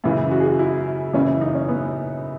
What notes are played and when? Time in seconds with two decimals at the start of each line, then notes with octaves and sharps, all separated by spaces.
0.04 F#2 C#3 E3
0.31 F#4
0.40 G#4
0.49 F#4
0.59 E4
1.13 F#2 C#3 E3 C#4
1.41 D#4
1.55 C#4
1.69 B3